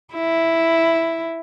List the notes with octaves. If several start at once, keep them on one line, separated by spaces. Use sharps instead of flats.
E4